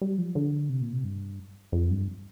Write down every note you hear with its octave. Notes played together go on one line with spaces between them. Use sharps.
G3
F3
D3
C3
A#2
C3
G2
F2
G2